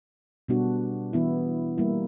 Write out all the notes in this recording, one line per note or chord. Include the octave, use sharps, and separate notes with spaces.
B2 G3 B3 D4 F#4
E3 B3 E4
G3 A#3 E4